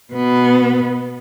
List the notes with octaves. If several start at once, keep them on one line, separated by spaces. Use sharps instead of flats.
B2 B3